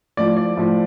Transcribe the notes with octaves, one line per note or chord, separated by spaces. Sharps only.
A2 F3 D5
D5
A2 F3